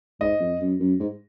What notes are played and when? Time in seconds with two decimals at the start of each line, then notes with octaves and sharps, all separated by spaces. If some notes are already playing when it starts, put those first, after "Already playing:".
0.20 G#2 D#5
0.40 F2
0.60 F#2
0.80 F#2
1.00 G#2